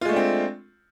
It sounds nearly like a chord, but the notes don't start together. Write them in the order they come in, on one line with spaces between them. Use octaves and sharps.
F4 G#3 A3 D4 C4